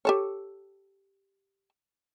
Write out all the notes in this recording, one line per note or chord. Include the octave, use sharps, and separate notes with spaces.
G4 A4 C#5